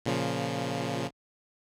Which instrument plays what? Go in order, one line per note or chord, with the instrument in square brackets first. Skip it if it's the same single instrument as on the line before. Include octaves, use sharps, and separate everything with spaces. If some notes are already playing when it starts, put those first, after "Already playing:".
[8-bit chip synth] A#2 C#3 F3